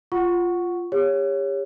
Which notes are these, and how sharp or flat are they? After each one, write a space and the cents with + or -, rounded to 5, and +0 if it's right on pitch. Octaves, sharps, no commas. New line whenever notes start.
F4 +0 F#5 +0 C#6 +0
G4 +40 C#5 +0